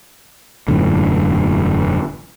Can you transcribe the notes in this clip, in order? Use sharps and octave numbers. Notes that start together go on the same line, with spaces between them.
E1 F#2 A2 D3